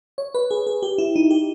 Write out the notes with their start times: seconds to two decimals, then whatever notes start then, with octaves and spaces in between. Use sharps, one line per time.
0.18 C#5
0.35 B4
0.51 G#4
0.67 G#4
0.83 G4
0.98 E4
1.16 D#4
1.31 G4